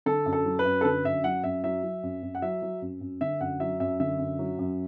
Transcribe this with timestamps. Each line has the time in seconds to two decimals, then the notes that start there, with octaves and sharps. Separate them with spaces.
0.06 D3 A4
0.26 F#2
0.33 A4
0.46 F#3
0.59 B4
0.65 F#2
0.81 A4
0.85 D3 B4
1.05 F#2 E5
1.24 F#3 F#5
1.44 F#2 E5
1.64 F#3 E5
1.84 F#3
2.03 F#2
2.23 F#2
2.35 F#5
2.42 F#3 E5
2.62 F#3
2.82 F#2
3.01 F#2
3.21 D3 E5
3.40 F#2 F#5
3.60 F#3 E5
3.80 F#2 E5
4.00 D3 E5
4.19 F#2
4.39 F#3
4.59 F#2